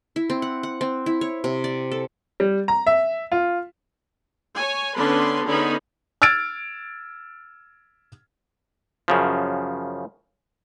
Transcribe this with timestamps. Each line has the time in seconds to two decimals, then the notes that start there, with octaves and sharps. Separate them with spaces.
0.16 E4
0.30 C4
0.42 F#5
0.63 F#5
0.81 C4
1.06 E4
1.21 C#5
1.44 C3
1.64 D5
1.91 A4
2.40 G3
2.68 A#5
2.87 E5
3.32 F4
4.55 C#5 G#5
4.96 D3 B3 C#4 D4 B4 C6
5.47 D3 B3 C#4 D#4 G#4 B5
6.22 E6 F6 G#6 A6 D7
9.08 F#2 C#3 F3